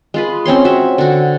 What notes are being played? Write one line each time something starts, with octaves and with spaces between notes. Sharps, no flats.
G#3 F4 B4
C4 C#4 C#5 C6
F#4 E5
D3 F#4